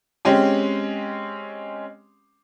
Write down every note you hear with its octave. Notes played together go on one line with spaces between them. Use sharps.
G#3 C4 C#4 G4